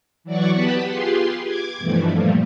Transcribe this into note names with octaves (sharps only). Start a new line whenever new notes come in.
E3 F#3 D5 F#5 C#6
B3 G4 B4 F#5 A5 B5
F4 G4 G#4 B4 C6
D6 G#6
G2 B2 E3 F3 A3
A#2 F3 G3 A3 A#3